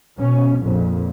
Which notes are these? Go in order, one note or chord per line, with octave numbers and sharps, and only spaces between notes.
B2 C#4
A#1 F2 A#2